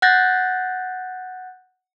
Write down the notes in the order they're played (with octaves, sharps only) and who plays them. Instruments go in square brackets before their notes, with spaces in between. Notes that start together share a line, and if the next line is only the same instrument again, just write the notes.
[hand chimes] F#5 F#6 G6 A6 A#6